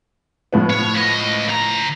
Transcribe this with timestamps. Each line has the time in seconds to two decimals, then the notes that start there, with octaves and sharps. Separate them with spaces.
0.53 A2 F3 B3
0.70 C#5
0.95 C#2 D#5
1.48 C#3 A#5